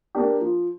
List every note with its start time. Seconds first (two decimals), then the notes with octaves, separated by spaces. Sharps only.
0.15 A#3 D4 G4
0.41 F3